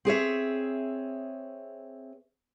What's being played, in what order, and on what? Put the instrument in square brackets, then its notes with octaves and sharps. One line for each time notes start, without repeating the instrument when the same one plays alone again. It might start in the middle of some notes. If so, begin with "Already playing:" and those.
[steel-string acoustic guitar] C4 G#4 C#5 E5